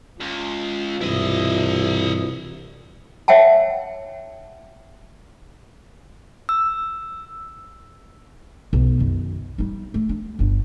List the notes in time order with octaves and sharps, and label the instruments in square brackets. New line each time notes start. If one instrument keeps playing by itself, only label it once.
[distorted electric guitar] C#2 [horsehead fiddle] F4
[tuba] C2 [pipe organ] G2 B2 E3 [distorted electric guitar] E4 D#5
[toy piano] C#5 E5 F#5 G5 A5
[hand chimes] E6
[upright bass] B1
F#2 D#3
G3 D#4
A3
D4
G1 D4